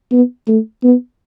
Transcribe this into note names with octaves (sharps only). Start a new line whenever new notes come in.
B3
A3
B3